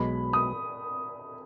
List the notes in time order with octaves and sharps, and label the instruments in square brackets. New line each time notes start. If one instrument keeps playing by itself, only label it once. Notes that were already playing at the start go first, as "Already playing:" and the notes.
Already playing: [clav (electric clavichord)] B1 B2 G#3 [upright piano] B5
[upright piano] D#6